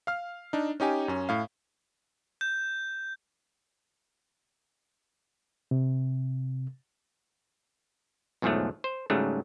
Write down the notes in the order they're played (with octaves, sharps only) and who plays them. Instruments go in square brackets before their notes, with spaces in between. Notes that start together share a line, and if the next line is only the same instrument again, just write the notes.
[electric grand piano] F5 F6
D4 D#4
C#4 D#4 G4 G#5
F#2 C#4
A2 F5
[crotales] G6
[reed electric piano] C3
[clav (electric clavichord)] B1 E2 G#2 F3 F#3 A3
C5
G#2 C#3 F#3 G3 A3